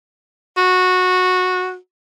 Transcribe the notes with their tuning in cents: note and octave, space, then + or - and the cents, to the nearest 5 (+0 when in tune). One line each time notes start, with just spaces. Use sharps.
F#4 -15